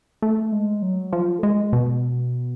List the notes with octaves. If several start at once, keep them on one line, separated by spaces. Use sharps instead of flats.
A3
G#3
F#3
F3
A3
G#3
B2